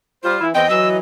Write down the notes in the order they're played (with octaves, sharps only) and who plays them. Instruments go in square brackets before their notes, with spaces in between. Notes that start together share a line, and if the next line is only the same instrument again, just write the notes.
[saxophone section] G3 C5 [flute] F4
[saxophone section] E3 E4
[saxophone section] E2 C4 [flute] D#5 [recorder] G5
[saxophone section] E3 F#3 [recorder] E6